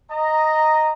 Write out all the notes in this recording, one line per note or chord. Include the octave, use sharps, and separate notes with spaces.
D#5 A#5